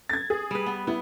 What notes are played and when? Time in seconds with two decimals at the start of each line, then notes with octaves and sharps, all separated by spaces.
0.09 G#6 A6
0.30 G#4
0.51 G3 B4
0.66 B3
0.87 B3 E4